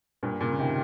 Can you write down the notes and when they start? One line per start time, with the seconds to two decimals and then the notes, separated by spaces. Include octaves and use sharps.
0.23 G2 A#2
0.40 A#2 C#3
0.52 C#3
0.59 C3 D#3